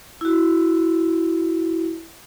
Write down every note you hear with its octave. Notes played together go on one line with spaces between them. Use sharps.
E4 F#4